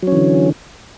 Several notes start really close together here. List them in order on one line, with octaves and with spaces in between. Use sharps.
F#3 C#4 E3 D3